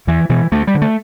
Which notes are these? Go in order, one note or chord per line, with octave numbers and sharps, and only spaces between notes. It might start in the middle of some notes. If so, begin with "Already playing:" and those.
E2 E3
B2 E3
D2 A3
G3
D3
A3